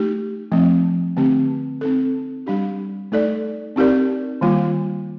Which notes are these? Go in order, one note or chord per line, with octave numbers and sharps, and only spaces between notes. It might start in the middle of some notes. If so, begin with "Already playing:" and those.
Already playing: A3 D#4 G4
F3 A3 C4
D3 A3 C4 G4
C4 D#4 A4
G3 D4 G4
A3 D#4 A4 D5
C4 D#4 G4 A#4 D5
D#3 G3 A#3 F4